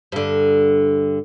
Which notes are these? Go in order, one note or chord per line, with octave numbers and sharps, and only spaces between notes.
G2 D3